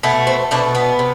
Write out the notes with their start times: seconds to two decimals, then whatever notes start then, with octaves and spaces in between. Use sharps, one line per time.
0.03 B2 A3 B3
0.27 C4
0.51 B2 A3 D4
0.75 B3
0.99 C3